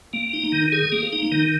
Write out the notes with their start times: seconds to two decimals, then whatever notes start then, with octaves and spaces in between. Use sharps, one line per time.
0.13 A#3
0.33 D#4
0.52 D#3
0.72 G#4
0.92 A#3
1.13 D#4
1.32 D#3